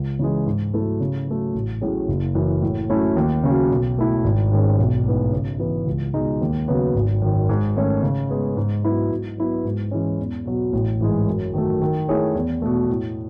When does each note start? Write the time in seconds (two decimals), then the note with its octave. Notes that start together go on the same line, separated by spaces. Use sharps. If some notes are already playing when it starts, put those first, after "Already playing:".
Already playing: C#2
0.19 C#3 E3 G#3
0.47 G#2
0.74 F#3 A3 E4 A4
1.01 C#3
1.27 F#3 A3
1.54 A1
1.81 A2 F#3 C#4 G#4
2.08 F#1
2.35 F#2 E3
2.62 A2
2.90 F#3 A3 C#4 E4
3.16 D#2
3.44 C#3 F#3 C#4 F#4
3.71 B1
3.97 B2 A3 E4
4.24 G#1
4.52 G#2 D#3 G#3 C#4
4.78 B1
5.05 A2 G#3 B3 D#4
5.32 C#3
5.60 E3 B3 E4
5.87 C#2
6.14 B2 G#3 D#4
6.41 D#2
6.68 C#3 F#3 B3
6.95 G#1
7.22 F#2 D#3
7.49 G#2
7.76 D#3 A3 C#4
8.02 C#3
8.30 G#3 B3
8.57 G#2
8.84 F#3 B3 E4
9.12 G#2
9.38 F#3 B3 E4 B4
9.65 G#2
9.91 E3 G#3 C#4
10.19 E2
10.45 B2 F#3
10.73 A1
11.01 G#2 E3 G#3
11.28 F#2
11.54 D#3 F#3 A3
11.82 D#3
12.09 A3 E4 G#4 C#5
12.35 E2
12.62 B2 A3
12.90 A2